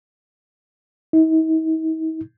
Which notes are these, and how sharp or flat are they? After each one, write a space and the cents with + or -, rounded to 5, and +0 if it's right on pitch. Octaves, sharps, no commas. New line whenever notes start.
D#4 +45